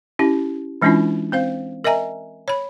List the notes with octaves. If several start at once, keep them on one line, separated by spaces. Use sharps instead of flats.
C#4 E4 G4
E3 G#3 C#4 D4 E4 F4
C4 C5 F5
A#4 D#5 E5 G#5 A#5
C#5 B5